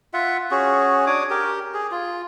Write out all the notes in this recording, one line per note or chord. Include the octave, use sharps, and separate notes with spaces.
F4 E5 F#5
C#4 F#4 G#4
D4 C#5 D6 D#6
G4 A#4
G#4
F4